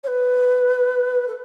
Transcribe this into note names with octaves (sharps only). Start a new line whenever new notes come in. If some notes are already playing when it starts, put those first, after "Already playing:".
C#5
B4
A4